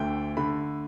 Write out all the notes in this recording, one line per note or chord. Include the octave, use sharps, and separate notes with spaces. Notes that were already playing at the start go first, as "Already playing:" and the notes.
Already playing: D2 D3 A3 G5
D3 A3 B5